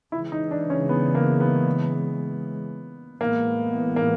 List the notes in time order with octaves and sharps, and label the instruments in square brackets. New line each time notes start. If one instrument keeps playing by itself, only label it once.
[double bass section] C#3 E3 G#3 [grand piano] E4
[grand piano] D#4
D4
C#4
B3
A#3
B3
[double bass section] A2 E3 G#3 B3 [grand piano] A#3
[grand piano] A#3